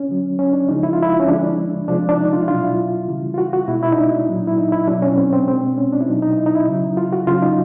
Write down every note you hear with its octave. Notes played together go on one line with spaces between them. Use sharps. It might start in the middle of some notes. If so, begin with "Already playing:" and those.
Already playing: C#4
D3 F#3
C#4
D4
C#3 F3 G#3 D#4
E4
F4
E4
C#4
D3 F3 G#3 D4
C3 F3 G#3 D4
D4
D#4
F4
E4
B2 F#3 F4
E4
C#3 E3 G3
F4
F#4
F#4
B2 G#3 E4
E4
D#4
D4
A#2 F#3
E4
D#4
E4
B2 F#3 D4
C#4
C4
C4
B2 G#3 C4
C#4
D4
E4
B2 F#3 D#4
D#4
E4
D#4
E4
C#3 F#3
F4
F#4
C#3 F#3 F4
D#4